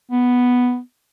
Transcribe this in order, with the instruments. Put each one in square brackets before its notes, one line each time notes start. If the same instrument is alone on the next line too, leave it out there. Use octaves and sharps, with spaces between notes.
[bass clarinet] B3